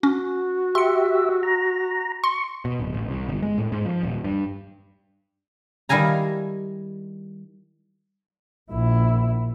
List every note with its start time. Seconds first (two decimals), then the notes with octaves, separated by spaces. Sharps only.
0.03 C#4 F#4
0.75 G4 E5 C6 C#7
1.43 A#5
2.24 C6 C#6
2.65 B2
2.80 D1
2.94 A1
3.08 C2
3.29 G1
3.42 G#3
3.58 A2
3.72 G#2
3.85 F3
4.03 D#1
4.24 G2
5.89 D#3 G3 E4 F5 G#5 A#5
8.71 A#1 E4